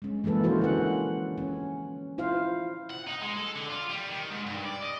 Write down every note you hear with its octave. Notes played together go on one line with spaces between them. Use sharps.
G#3 C#4
E3 G#3 A#3 A4 B4
F3 C#4 E4 F#4 A#4 C5
D3 C#4 F#5
C#4
E4 F4 C5 F5
F#5
D#4
G#3
A4
D3
F4
G3
D#3
G#2
G2
D5
D#5